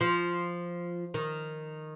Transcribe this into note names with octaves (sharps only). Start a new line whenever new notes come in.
F3
D#3